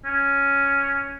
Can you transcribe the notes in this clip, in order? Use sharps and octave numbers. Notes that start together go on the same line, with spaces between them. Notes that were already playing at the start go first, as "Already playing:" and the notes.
C#4